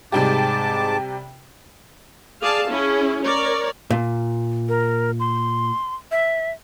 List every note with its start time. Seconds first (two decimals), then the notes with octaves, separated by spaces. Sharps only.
0.12 G#2 C3 G3 G4 A5 D6
2.42 G#4 D5 F5 A5
2.70 C#4 E4 G#4
3.23 A#4 C#5 D5
3.90 A#2
4.69 A#4
5.20 C6
6.11 E5